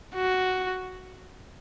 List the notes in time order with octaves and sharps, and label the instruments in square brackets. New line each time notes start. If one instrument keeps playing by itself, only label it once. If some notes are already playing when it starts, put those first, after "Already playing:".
[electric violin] F#4